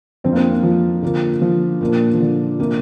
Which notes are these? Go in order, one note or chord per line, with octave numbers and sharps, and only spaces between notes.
F2 F3 C4 D4
A#3
C4
A#3
F3
D3 A#3 F4
F3
A#2 A#3 D4
F3
D3
C3 A#3 D4 F4